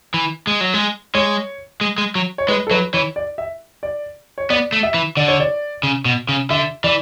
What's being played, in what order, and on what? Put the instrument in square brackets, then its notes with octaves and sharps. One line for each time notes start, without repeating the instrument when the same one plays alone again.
[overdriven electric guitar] E3
G#3
F#3
G#3
[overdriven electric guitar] G#3 [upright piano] C#5
[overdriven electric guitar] G#3
G#3
F#3
[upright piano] C#5
[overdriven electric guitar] G#3 [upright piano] B4
[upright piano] A4
[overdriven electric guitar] F#3 [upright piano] B4
[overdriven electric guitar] E3 [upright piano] C#5
[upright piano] D5
E5
D5
C#5
[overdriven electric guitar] B3 [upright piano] D5
[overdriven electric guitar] A3
[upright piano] E5
[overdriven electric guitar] E3
[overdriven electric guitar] D3 [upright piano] D5
[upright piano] C#5
D5
[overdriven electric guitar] C#3
B2
C#3
[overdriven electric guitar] D3 [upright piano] E5
[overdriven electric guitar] E3 [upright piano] D5